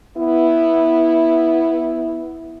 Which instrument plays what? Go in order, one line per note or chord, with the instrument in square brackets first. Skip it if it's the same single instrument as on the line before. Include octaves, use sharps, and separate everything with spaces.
[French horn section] B3 E4